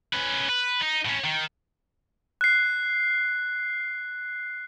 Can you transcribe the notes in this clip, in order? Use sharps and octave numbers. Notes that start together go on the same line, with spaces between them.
C#4 B4
B4
D#4
A2 C#4
D#3
F#6 C7